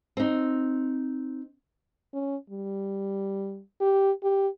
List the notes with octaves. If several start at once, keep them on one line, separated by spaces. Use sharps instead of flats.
C4 D#4
C#4
G3
G4
G4